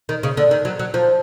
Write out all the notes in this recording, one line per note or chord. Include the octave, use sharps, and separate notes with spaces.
D#3
C#3
D3
D#3
F#3
F#3
F3